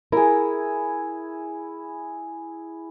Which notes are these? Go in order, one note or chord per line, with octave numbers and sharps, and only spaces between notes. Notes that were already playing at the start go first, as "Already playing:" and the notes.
E4 G#4 A#4